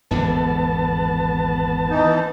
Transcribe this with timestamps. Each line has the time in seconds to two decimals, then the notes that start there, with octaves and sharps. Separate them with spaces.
0.11 G#1 E2 D3 B3 A5
1.90 E3 D#4